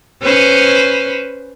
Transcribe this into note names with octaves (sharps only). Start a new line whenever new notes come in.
C#4 B4 C5